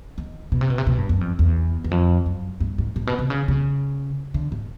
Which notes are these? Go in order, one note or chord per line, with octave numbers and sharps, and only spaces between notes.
D#3
B2
C3
B2
C3
B2
G2
F#2
F2
E2
E2
F2
F#2
G2
G#2
A2
B2
C3
C#3
C#3
D3
G#2